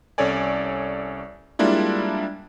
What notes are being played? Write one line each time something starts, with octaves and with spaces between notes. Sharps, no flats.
C2 C#4 A4 C#5 D5 G#5
G3 G#3 A#3 D4 E4 F4